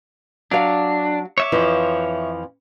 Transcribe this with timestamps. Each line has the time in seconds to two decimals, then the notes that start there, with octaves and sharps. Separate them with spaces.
0.51 F#3 D4 F5
1.38 C#5 E5 D6
1.52 F2 E3 F3